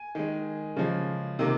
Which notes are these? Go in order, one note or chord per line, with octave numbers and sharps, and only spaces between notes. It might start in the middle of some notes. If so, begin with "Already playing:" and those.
Already playing: G#5
D#3 G#3
C#3 F3 G#3
C3 D#3 A#3